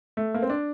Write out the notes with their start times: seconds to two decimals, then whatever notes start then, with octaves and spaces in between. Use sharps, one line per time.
0.17 A3
0.34 A#3
0.43 C4
0.50 D4